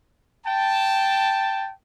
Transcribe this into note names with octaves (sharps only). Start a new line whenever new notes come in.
G5 A5